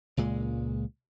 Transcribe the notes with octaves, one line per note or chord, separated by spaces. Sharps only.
C#2 A#2 G#3